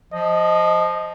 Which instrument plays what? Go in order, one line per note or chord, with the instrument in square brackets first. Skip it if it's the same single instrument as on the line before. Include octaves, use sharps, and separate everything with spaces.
[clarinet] F3 [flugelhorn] D#5